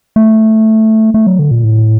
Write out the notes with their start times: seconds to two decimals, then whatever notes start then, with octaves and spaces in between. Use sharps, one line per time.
0.16 A3
1.14 A3
1.27 F#3
1.39 D3
1.51 A#2
1.64 A2